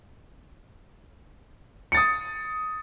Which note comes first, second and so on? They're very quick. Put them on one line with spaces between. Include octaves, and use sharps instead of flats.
C#7 A6 D#6